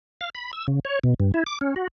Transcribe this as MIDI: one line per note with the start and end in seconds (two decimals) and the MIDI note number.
0.21 0.30 77
0.35 0.51 83
0.53 0.67 88
0.68 0.80 49
0.85 0.99 73
1.04 1.14 47
1.20 1.32 43
1.34 1.44 64
1.46 1.59 86
1.61 1.74 61
1.76 1.87 66